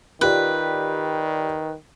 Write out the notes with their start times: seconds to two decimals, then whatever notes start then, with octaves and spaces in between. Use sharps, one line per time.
0.21 D#3 F4 G4 B4 D5